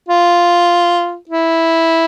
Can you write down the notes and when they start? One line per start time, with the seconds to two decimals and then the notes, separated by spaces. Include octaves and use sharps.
0.08 F4
1.29 E4